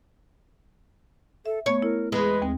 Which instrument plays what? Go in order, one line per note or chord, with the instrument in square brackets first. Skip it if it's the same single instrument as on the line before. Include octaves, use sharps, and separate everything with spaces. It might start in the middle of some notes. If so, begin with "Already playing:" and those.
[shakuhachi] A4 [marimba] E5
[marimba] A3 B3 [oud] C#5 [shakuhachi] C#6
[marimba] E4 [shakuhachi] A#4
[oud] E2 G#3 [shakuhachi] B4
[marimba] D#2 C4